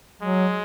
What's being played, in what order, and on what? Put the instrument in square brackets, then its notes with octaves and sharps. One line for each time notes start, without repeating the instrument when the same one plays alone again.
[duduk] F#3 [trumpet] G#3